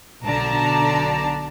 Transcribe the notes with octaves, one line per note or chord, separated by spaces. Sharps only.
B1 D3 D5 A5 A#5